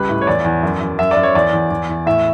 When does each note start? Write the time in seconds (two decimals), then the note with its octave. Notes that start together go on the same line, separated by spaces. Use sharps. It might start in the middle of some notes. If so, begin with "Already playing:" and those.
Already playing: C#2 G3 B4
0.09 A2
0.21 C#5
0.27 E2 D5
0.45 E2
0.63 F#2
0.81 F#2
0.98 F#2 E5
1.11 D5
1.17 F#2
1.23 C#5
1.35 E2 D5
1.53 E2
1.71 E2
1.89 E2
2.06 A2 E5